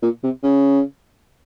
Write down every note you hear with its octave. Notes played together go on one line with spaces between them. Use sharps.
A#2
C3
C#3